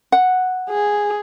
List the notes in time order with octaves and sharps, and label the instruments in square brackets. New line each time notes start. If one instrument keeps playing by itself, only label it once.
[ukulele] F#5
[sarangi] G#4